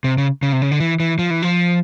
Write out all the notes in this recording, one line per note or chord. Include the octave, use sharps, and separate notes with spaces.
C3
C#3
C#3
C3
C#3
D3
E3
E3
F3
E3
F3